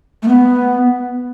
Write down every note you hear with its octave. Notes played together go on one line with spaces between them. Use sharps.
A3
B3